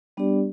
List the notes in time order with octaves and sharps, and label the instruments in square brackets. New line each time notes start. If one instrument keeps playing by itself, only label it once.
[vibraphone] G3 B3 D4 G4 D5